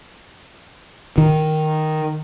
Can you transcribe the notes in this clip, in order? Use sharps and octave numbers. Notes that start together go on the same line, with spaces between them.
D#3